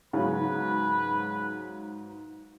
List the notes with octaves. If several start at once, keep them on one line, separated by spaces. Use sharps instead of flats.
G#2 C#3 F#3 B3 B4